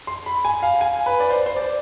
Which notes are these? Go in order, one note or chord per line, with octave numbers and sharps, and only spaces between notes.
C6
B5
G#5
F5
G#5
B4
D5
C5
C5
D5